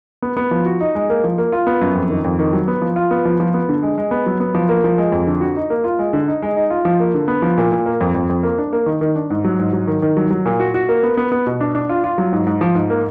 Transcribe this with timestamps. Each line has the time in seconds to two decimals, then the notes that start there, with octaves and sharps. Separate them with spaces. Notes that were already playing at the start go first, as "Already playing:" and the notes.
0.22 B3
0.37 B3
0.51 F3
0.66 F#4
0.80 D#4
0.95 G#3
1.10 A#3
1.24 F3
1.38 A#3
1.52 F4
1.67 B3
1.81 F#2
1.95 F2
2.10 D#3
2.24 F2
2.39 D#3
2.53 F#3
2.68 B3
2.82 F3
2.96 F4
3.11 B3
3.25 F3
3.40 F3
3.54 B3
3.69 D3
3.82 G#3
3.98 G#3
4.11 B3
4.26 F#3
4.40 B3
4.54 F3
4.69 A#3
4.84 F3
4.98 G#3
5.12 F2
5.27 D3
5.41 F#4
5.56 D#4
5.70 A#3
5.84 F4
5.99 G#3
6.13 D3
6.27 D#4
6.42 G#3
6.56 D#4
6.70 F4
6.85 F3
7.00 A#3
7.14 D3
7.28 B3
7.42 F3
7.58 A#2
7.72 A#2
7.86 A#3
8.01 F2
8.15 F2
8.30 F2
8.43 A#3
8.58 D4
8.73 A#3
8.86 D#3
9.01 D#3
9.16 D4
9.30 G#2
9.44 F#3
9.59 G#2
9.73 F#3
9.87 D#3
10.02 D#3
10.17 F#3
10.31 F#3
10.46 A#2
10.60 F#4
10.74 F#4
10.89 A#3
11.03 B3
11.17 B3
11.32 B3
11.47 B2
11.61 D4
11.75 D4
11.89 F4
12.04 F4
12.18 F#3
12.33 G#2
12.47 G#2
12.61 F3
12.75 G#2
12.90 A#3